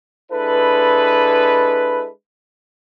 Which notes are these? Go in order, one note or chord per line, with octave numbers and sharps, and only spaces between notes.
G#3 D4 E4 A4 B4